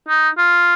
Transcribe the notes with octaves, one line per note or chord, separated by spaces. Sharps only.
D#4
F4